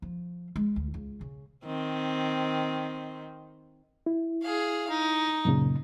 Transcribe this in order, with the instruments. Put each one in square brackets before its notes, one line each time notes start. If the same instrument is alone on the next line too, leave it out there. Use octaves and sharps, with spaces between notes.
[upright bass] F3
G#3
D2
C#2
C#3
[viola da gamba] D#3 C4
[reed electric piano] E4
[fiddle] G#4 F5
D#4
[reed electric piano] F#2 A#2 C#3